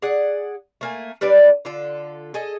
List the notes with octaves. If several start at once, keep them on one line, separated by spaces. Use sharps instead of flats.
G#4 D5 F#5
A3 A#3 G#5
G3 D4 B4 D5
D3 F4 A4
G#4 A4 D#5